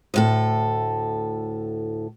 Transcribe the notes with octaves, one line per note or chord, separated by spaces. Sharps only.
D2 A2 A4